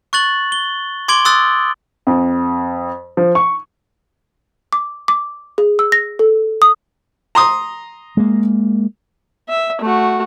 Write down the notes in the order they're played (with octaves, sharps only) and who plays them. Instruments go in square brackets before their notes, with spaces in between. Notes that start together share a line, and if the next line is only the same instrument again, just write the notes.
[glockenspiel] C#6 F#6 A6 F#7
G7
C6 D6 G#6 D7 F#7 G7
C6 D#6 E6 F#6 A6
[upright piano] F2
F3
C#6
[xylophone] D6
D6
G#4
E6
A#6
A4
D#6
[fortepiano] A#5 C6 D#6
[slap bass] G#3 A#3
[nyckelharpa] E5
A3 F#4